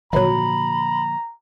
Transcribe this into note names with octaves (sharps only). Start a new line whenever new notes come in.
G#1 A#2 D3 F3 F#3 A#5 B5